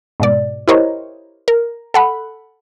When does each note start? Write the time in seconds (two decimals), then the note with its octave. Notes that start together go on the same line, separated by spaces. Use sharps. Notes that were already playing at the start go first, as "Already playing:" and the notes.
0.20 G#2 B2 D5
0.68 E4 G4 A#4 C5 C#5 D#5
1.48 A#4
1.94 A4 F#5 B5